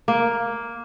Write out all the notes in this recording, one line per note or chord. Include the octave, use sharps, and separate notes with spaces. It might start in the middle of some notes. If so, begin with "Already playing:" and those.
A#3